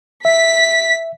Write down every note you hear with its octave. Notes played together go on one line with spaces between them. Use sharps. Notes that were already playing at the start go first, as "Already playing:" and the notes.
E5 B6